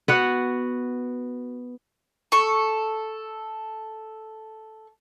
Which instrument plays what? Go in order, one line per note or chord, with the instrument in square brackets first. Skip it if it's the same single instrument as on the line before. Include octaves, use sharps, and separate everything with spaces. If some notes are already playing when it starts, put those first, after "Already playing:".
[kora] B3 F#4 F#5
[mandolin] A4 C#6